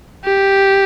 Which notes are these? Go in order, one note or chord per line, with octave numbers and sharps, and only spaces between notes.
G4